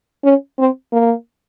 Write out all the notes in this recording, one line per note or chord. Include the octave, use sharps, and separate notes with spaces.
C#4
C4
A#3